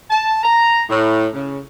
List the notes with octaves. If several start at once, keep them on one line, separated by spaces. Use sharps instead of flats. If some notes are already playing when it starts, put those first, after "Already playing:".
A5
A#5
A2
C#3